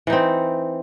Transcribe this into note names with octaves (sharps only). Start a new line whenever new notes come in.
E3 C4 D#4